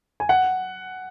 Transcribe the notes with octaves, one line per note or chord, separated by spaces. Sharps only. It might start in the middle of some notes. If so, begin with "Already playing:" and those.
G#5
F#5